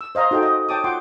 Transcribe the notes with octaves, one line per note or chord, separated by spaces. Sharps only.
E6
C5 D#5 F5 A#5 C6
D#4 F#4 A4 C5 G5
D#5
C#5 G5 A5 D6 D#6
F4 F#5 G5 C6 D6